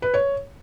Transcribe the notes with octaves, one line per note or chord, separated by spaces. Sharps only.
B4
C#5